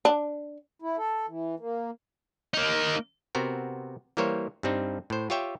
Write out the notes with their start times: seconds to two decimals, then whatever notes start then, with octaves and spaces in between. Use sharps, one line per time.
0.05 D4
0.82 E4
0.97 A4
1.27 E3
1.60 A#3
2.54 A#3 D#4
3.35 C3 B3 C4 F#4 A#4
4.17 E3 G3 A#3 A#4 C5 C#5
4.63 G2 G3 C4 D#4
5.10 A2 C5
5.30 F4 G4 C#5 E5 G5